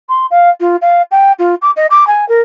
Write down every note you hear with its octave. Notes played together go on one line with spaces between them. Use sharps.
C6
F5
F4
F5
G5
F4
D6
D#5
D6
G#5
A#4